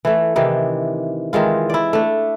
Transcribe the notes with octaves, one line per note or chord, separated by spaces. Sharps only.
E3 A3
C3 D#3 E3 D4
D#3 E3 G#3 F4
E4 D5
A3 D4